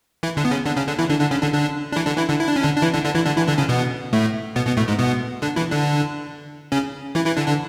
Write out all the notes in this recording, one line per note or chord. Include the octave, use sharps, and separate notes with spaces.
E3 E4
D3 D4
B3
C#3 C#4
D3 D4
C#3 C#4
D3 D4
E3 E4
D3 D4
D3 D4
C#3 C#4
D3 D4
D3 D4
D4
E3 E4
D3 D4
E3 E4
D3 D4
E4
D4
C#4
D3 D4
D4
E3 E4
D3 D4
D3 D4
E3 E4
D3 D4
E3 E4
D3 D4
C#3 C#4
B2 B3
A2 A3
B2 B3
B2 B3
A2 A3
G#2 G#3
B2 B3
D3 D4
E3 E4
D3 D4
C#3 C#4
E3 E4
E3 E4
D3 D4
D3 D4